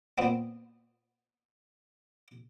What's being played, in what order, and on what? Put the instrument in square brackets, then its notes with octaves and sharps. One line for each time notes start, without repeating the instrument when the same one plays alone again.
[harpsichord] A#2 B3 C4